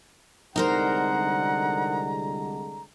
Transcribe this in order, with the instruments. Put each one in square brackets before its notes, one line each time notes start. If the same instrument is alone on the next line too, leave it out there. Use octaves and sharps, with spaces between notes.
[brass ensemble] C2 D3 G#3 [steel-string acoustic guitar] D#4 A#4 C5 [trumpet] F#5 [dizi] A#5